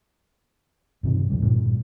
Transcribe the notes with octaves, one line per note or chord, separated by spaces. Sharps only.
G2 C3 D#3
F2 D3 G3
G2 A#2